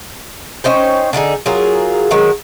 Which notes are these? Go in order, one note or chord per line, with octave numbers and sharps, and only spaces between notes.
C#4 D#4 C5 G5
D3 D4 D#4 G#4
F#3 F4 G#4 A#4
D#3 F#3 G#3